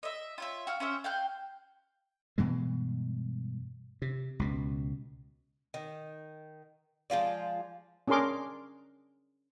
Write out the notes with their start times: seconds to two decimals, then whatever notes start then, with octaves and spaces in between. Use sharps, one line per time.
0.03 D#5 E5
0.38 F4 C#5 E5
0.67 F#4 F5
0.80 C#4 C5 E5
1.04 F5 G5 F#6
2.38 G2 B2 E3 G#3
4.02 C3
4.39 C#2 B2
5.74 D#3
7.10 F3 G#3 F4 D5
8.08 C#4 D4 G#4 A#4 C6 D6